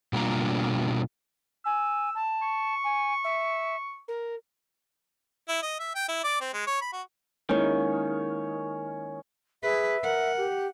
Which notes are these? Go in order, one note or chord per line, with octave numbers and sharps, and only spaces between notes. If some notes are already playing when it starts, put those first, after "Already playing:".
B2 G3 A#3 D4 F4 A#5
G#5 E6
A5
C#6
G#5
E5
A#4
E4
D#5
E5
G5
E4
D5
C4
G#3
C#5
B5
F#4
D#3 G#3 A#3 C#4 E4 C#5
G#4 B4 E5
A#4 F#5
G4